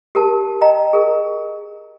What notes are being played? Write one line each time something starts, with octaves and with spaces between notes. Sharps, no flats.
G4 A#4 A5
D#5 G5 A#5
G#4 A#4